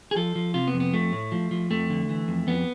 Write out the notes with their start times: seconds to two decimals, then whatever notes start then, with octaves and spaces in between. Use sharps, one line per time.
0.11 G#4
0.16 F3 A4
0.35 F3
0.54 C3 F4
0.68 B3
0.74 F2
0.80 B3
0.93 F3 A3
1.12 A2
1.32 F3
1.51 F3
1.70 F2 A3
1.90 D3
2.09 E3
2.28 F2
2.47 F2 B3